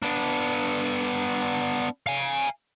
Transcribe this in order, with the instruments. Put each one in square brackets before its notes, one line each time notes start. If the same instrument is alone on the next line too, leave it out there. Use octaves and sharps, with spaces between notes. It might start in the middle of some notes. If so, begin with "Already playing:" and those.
[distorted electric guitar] B3 D4
F5 G#5